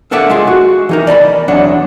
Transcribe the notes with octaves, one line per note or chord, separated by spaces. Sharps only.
D4 A4 A#4 D5 E5 F#5
G#3 F4 G#4
F#4
E3 D#4 A#4
D5 D#5 A5 B5
E2 F#3 D4 F#5